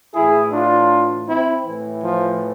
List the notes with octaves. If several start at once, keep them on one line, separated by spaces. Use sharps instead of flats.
A2 E3 E4 G#4
D4 F4
C4 E4
A2 E3
F3